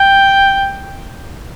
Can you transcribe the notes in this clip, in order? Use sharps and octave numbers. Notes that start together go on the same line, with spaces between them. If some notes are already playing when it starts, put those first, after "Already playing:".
Already playing: G5